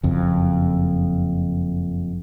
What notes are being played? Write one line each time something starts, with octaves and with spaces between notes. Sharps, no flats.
F#1 F2